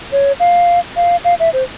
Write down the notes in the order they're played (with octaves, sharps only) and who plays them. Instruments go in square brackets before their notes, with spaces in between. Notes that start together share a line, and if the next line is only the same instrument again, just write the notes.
[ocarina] C#5
F5
F5
F5
E5
C5